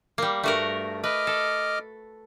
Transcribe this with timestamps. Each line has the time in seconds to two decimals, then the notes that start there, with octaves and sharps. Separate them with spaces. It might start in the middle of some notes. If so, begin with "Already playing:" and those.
0.18 G3 A#3
0.44 G2 A3 F#4 A#4
1.04 B4 D#5 D6 F6
1.27 A4